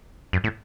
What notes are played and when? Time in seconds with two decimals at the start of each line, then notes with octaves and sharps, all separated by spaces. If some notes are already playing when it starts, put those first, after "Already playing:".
0.33 F#2
0.44 A2